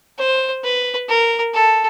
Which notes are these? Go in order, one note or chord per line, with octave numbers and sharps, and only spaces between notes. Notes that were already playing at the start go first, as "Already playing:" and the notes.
C5
B4
A#4
A4